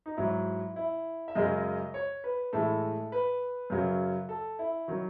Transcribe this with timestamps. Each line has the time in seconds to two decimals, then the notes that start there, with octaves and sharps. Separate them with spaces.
0.06 D#4
0.17 G#2 F#3 E4
0.76 E4
1.28 E5
1.35 F#2 C#3 G#3 D#5
1.94 C#5
2.24 B4
2.53 A2 E3 G#3 A4
3.12 B4
3.70 F#2 C#3 F#3
4.29 A4
4.59 E4
4.88 D#3 F#3